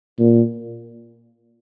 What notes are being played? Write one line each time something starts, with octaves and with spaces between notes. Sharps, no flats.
A#2